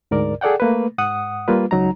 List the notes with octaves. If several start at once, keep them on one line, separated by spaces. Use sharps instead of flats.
D2 G#2 A#4 D5
G#4 A4 D5 F#5 G5
A3 A#3 B4
G#2 F#5 D#6
G3 A#3 F4 B4
C#2 F#3 D#4 A#5